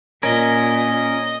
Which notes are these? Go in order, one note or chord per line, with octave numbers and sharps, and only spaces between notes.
A#2 C#4 A#4 D#5